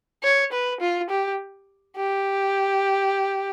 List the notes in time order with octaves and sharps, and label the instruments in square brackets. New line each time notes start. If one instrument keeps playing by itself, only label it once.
[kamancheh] C#5
B4
F4
G4
G4